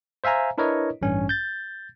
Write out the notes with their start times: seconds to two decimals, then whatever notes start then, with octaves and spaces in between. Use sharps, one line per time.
0.24 C5 E5 F5 G#5 A#5
0.58 D4 E4 A#4 B4 C#5 D#5
1.02 A1 G2 C#4
1.29 G6 A6